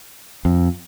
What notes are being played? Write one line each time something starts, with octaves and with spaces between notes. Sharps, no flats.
F2